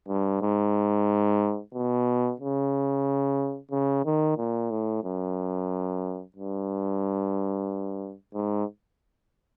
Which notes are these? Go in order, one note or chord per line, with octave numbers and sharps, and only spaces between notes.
G2
G#2
B2
C#3
C#3
D#3
A#2
A2
F#2
G2
G#2